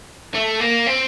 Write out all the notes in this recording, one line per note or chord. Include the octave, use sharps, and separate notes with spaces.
A3
A#3
C4